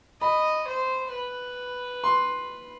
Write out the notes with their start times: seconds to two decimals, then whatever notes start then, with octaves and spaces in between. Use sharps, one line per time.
0.22 D#5 B5
0.68 C5
1.13 B4
2.04 C6